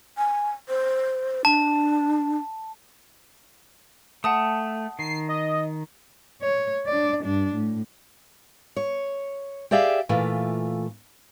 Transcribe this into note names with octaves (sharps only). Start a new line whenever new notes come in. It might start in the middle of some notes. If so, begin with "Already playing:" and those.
G#5
C5
D4 A5
A3 F#5 A5 D#6
D#3 C7
D#5
C#5
D4 D5
G2 D4
A2
C#5
G4 G#4 D5 E5 F5 G5
A#2 E3 A3 F4